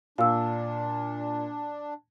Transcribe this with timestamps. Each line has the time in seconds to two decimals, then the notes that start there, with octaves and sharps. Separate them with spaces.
0.18 A#2 D4 F5 E6